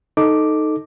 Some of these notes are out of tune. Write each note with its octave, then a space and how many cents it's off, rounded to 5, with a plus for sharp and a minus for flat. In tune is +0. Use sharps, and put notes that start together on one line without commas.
D#4 +0 A4 +0 D6 +0